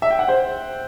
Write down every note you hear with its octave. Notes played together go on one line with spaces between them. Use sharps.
E5
G5
F#5
C5